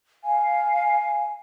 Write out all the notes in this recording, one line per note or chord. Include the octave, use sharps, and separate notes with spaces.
F5 G#5